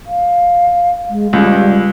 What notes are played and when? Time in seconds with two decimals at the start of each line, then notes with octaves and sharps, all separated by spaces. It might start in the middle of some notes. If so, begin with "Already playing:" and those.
0.07 F5
1.10 G#3
1.33 C#2 G3